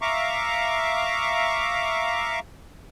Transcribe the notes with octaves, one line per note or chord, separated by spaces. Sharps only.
E5 F5 A#5 C#6 D6